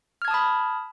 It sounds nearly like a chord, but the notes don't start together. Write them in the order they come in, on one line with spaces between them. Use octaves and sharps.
F6 G#6 A5 D#6 B5